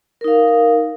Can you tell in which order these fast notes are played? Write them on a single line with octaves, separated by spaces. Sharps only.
A#4 D#4 F5